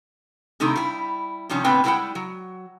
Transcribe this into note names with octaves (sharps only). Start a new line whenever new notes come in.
C3 D#3 A3 D#4 E4
G3 E4
C3 D#3 F3 G3 C#4
A2 D3 B3 C4 B4 G5
G3 G#3 E4 A#4 F#5 G5
F#3